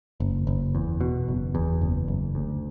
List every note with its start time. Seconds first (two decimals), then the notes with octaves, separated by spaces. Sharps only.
0.20 F#1
0.47 F#1
0.75 E2
1.01 B2
1.28 F#1
1.55 E2
1.81 F#1
2.08 F#1
2.35 D2